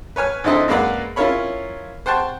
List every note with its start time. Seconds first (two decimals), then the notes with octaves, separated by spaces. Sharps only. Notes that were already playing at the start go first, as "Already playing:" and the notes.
0.16 B4 C#5 G#5 F6
0.44 D2 D3 C4 D#4 E4 D#5
0.68 F#2 G#3 A#3 B4 D5 F#5
1.16 C#4 E4 F4 A#4 C#5 B5
2.06 C5 F#5 G5 A5 C#6